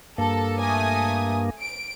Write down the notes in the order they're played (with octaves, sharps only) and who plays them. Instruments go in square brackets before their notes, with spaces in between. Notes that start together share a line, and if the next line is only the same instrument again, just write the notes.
[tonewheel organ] G2 A#3 [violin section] A4
[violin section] A3 G#5 D#6
D7